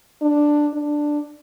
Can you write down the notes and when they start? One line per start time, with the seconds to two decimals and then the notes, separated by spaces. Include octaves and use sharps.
0.22 D4
0.73 D4